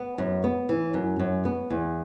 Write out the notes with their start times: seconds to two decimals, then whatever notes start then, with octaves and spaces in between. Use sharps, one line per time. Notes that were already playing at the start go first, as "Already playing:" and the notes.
Already playing: B3
0.18 F#2
0.44 B3
0.69 E3
0.94 F#2
1.19 F#2
1.45 B3
1.70 E2